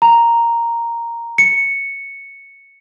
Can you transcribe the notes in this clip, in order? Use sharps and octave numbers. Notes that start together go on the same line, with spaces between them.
A#5
C#7